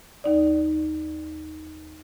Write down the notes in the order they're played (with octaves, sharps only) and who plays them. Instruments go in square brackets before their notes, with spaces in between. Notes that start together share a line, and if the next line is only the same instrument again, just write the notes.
[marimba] D#2 D#4 D5